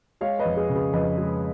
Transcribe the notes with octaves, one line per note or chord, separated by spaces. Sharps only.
G#3 C#5 F5
B4 D#5
F2
G#4 B4
C#3
G#4 B4
F2 B4 D#5
G#3